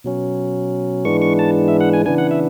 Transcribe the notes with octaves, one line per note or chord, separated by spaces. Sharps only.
B2 F#3 C#4
G#2 E3 G#3 B3 D4 C#6
C#6
A5
E5
F#5
G#5
C#3 E3 B3 D4 G#5
F#5
E5